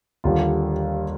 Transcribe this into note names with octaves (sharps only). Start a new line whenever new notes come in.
D#2 D3 G3 A#3 F4